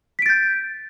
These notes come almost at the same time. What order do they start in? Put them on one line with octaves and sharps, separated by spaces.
B6 D7 A6 G6